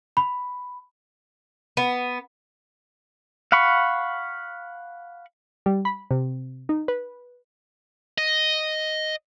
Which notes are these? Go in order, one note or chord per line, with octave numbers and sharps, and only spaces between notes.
B5
B3
F5 F#5 B5 C#6
G3
B5
C3
D#4
B4
D#5